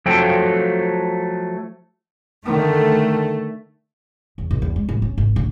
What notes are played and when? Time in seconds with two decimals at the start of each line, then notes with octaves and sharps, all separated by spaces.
0.06 F3 F#3 A3 A4 G5
2.46 D3 D#3 A3
4.38 E2
4.51 A#1
4.62 E2
4.76 G#3
4.89 A1
5.02 C#4
5.18 G#1
5.36 D3